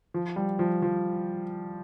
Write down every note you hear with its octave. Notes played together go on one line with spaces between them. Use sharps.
F3
G3
F3
F3